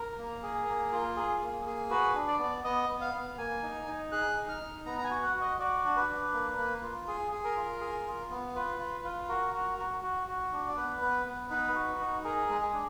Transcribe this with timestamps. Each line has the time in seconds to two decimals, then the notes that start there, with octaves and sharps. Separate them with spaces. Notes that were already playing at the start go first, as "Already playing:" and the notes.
Already playing: A#4
0.18 A#3
0.43 G#4
0.67 A#3
0.92 F4
1.17 G#4
1.41 A#3
1.66 G#4
1.90 F#4 B4
2.15 D4
2.27 D5
2.39 B3
2.64 B3 D#5
2.89 B3
3.01 F5
3.13 B3
3.38 A#3 G#5
3.63 D#4
3.87 D#4
4.12 G#4 F#6
4.36 D#4
4.49 F6
4.61 D#4
4.86 B3 A#5
4.98 A#5
5.04 G#5
5.11 F#4
5.22 F#5
5.35 F#4
5.41 D#5
5.59 F#4 D5
5.85 D4
5.96 B4
6.09 D4
6.33 A#3
6.58 A#3
6.83 F4
7.08 G#4
7.32 G#4
7.44 A#4
7.57 F4
7.81 G#4
8.06 F4
8.30 B3
8.55 F4 B4
8.79 F4
9.04 F4
9.29 F#4 A#4
9.54 F#4
9.78 F#4
10.03 F#4
10.28 F#4
10.52 D4
10.68 D5
10.76 B3 B4
11.01 B3
11.26 B3
11.50 D#4 B4
11.75 F#4
12.00 D#4
12.24 G#4 A#4
12.49 G#3
12.61 G#4
12.73 D4